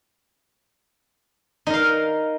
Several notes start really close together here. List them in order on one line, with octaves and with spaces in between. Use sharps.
D#4 A#4 F5